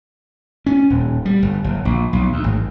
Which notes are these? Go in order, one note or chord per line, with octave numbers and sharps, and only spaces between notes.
C#4
D#1
G3
G1
F#1
A#1
B1
D2
G#1